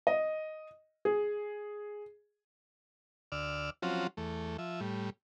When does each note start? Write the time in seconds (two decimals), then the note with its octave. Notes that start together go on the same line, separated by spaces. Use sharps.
0.07 D#5
1.05 G#4
3.32 D2 D5 E6 F6
3.82 F3 F#3 C4 C#4 F4 F#4
4.17 E2 A3
4.59 F3 E5
4.80 A2 G3